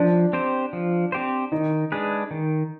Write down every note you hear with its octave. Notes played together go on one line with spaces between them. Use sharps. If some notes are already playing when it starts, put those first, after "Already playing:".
Already playing: F3 D4
C4 G4 C5
F3
C4 G4 C5
D#3 D#4
G#3 D4 G#4 B4
D#3